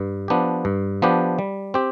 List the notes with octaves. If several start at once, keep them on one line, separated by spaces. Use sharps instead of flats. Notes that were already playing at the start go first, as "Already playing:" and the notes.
Already playing: G2
F3 B3 D4 G4
G2
F3 B3 D4 G4
G3
C4 G4